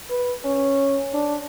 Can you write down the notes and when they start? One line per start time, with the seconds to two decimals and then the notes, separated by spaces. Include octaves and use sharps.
0.11 B4
0.45 C#4
1.14 D4